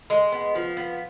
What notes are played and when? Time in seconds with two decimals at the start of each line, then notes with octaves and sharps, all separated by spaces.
0.10 G#3
0.32 B3
0.55 F3
0.77 B3